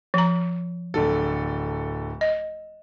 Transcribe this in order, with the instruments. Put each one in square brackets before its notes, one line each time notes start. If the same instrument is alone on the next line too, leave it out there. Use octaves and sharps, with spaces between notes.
[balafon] F3 A#5
[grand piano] D1 D3 A4
[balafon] D#5